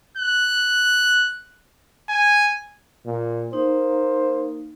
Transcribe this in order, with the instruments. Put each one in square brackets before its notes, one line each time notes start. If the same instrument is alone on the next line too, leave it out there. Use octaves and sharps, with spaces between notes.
[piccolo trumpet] F#6
G#5
[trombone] A#2
[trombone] A#3 [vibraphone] D#4 [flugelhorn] C5